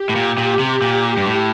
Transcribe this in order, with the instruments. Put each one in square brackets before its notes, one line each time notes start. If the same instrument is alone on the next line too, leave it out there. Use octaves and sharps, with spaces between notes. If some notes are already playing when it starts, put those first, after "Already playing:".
Already playing: [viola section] G4
[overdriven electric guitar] A2
A#2
A#2
C3
A#2
G2
A2